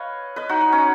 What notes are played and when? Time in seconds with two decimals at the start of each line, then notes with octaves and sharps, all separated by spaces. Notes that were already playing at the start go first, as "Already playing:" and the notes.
Already playing: B4 C#5 D#5 F5
0.36 B4 D#5
0.49 D#4 F#4
0.61 D#4
0.72 C#4